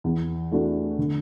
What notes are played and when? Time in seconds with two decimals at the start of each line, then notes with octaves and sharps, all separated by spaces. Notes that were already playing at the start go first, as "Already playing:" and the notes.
0.04 E2
0.51 E3 A3 D4 F#4
0.98 D3